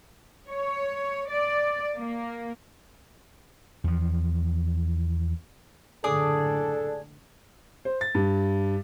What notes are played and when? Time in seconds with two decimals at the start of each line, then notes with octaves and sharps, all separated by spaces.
0.47 C#5
1.30 D5
1.97 A#3
3.84 E2 F3
6.04 F#1 A2 D3 D4 G#4 A4 D5 D#6
7.85 C5
8.01 A6
8.15 G2